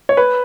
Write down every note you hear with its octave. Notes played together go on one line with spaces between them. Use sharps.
C#5
B4